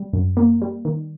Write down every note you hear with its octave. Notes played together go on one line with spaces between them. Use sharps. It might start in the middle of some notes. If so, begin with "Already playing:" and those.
Already playing: G3
F#2
A#3
G3
D#3